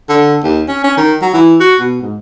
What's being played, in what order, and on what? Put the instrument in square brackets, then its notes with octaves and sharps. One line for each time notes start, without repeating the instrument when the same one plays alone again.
[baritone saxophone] D3
D#2
C#4
C#4
D#3
F#3
E3
F#4
B2
G#2